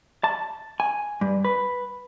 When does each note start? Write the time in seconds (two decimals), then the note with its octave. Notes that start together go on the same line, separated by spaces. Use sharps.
0.24 A5
0.80 G#5
1.21 G2
1.45 B4